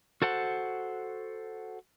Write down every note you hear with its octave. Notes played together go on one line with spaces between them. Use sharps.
F#4 A4 C5 F#5